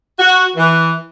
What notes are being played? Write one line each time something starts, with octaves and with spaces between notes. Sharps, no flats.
F#4
E3